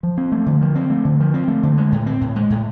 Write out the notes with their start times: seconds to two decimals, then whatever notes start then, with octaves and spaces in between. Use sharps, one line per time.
0.03 F3
0.17 C4
0.32 A3
0.46 D3
0.61 F3
0.75 C4
0.90 A3
1.05 D3
1.20 F3
1.34 C4
1.48 A3
1.63 D3
1.78 G#3
1.92 A2
2.06 C4
2.21 A2
2.36 G#3
2.50 A2